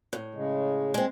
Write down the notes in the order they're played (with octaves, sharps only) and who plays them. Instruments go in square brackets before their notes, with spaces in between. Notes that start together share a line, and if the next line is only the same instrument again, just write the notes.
[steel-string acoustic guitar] A2
[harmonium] C#3 G#3
[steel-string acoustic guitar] G#3 C4